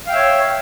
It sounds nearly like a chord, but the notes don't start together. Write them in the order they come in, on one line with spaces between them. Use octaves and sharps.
F5 G5 E5 C#5